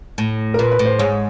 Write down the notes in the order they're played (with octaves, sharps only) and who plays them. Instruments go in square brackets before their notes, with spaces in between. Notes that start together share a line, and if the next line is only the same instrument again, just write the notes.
[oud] A2
[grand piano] A#4
[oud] A#2 [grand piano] B4
[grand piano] B4
[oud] A2
[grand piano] C5
[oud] G#2 [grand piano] C#5